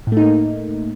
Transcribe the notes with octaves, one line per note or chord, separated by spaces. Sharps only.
A2 A3 A#3 D#4